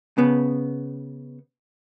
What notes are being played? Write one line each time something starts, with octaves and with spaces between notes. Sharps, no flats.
C#3 B3